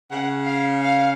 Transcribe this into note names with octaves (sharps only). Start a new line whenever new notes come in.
C#3 F#5
F5
F5